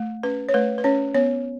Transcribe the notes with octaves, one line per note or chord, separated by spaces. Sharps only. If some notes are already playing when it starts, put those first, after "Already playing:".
Already playing: A3
C#4 B4
C#5
A3 B4
B4
C#4 C#5
B3 C#5